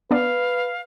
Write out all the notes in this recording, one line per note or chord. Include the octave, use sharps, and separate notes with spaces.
B3 D4 B4 D5 F5